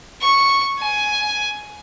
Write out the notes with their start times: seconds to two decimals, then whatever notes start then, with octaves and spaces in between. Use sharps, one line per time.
0.21 C#6
0.79 G#5